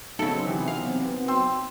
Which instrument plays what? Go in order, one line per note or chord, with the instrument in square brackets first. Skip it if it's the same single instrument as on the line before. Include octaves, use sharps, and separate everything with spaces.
[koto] C#3 A4 [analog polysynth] F#3 B3 C4 [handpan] D#4
[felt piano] C3 E3
[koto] F5
[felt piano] G5 C6 E6